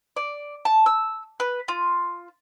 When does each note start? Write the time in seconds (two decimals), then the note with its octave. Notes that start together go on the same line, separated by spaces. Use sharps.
0.16 D5
0.65 A5
0.86 E6
1.40 B4
1.68 F4